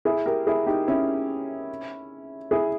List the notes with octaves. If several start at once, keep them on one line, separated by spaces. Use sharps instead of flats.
E4 G#4
G4 A#4
E4 G#4
D#4 G4
C#4 E4
E4 G#4